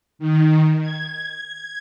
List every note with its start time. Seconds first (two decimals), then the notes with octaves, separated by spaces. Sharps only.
0.19 D#3
0.81 G#6